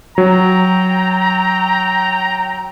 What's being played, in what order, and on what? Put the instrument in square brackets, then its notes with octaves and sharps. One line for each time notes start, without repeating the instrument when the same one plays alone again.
[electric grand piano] F#3 [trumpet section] G5 A#5